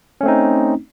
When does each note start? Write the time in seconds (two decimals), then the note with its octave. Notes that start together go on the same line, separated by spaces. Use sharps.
0.21 C#4
0.23 A3
0.26 C4
0.28 D#4